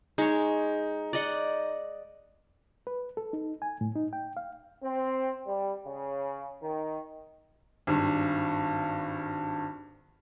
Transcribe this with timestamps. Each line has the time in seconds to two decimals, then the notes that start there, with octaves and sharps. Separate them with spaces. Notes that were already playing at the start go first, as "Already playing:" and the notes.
0.18 G#3 D#4 C#5
1.13 D5 D#5 F#5
2.87 B4
3.17 A4
3.33 D#4
3.62 G#5
3.81 A2
3.96 D#4
4.13 G5
4.37 F5
4.82 C4
5.47 G3
5.86 C#3
6.62 D#3
7.87 G#1 G2